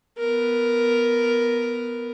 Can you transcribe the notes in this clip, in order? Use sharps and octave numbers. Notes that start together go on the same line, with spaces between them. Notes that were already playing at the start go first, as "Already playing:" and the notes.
B3 A#4